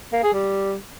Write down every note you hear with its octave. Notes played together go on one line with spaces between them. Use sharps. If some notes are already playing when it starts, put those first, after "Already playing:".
A#3
G#4
G3